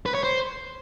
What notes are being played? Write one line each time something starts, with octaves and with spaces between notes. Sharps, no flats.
B4
C#5
C5